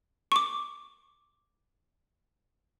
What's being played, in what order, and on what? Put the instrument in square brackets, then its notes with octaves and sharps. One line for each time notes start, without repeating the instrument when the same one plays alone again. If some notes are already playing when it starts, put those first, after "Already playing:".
[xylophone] C#6 D6